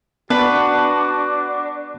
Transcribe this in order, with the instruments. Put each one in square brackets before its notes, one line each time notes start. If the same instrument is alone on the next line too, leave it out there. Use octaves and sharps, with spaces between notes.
[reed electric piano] B3 [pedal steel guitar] D4 [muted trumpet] F#4 [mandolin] B4